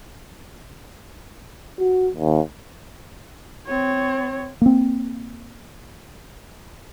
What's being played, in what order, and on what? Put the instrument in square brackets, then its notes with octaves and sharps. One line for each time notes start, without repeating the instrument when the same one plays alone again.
[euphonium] F#4
D#2
[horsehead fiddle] C4 C#5
[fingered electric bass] A#3 C4